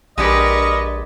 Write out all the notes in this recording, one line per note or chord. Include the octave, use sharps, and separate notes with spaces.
A#1 G#3 D4 G4 A#4 B4 D#5 C#6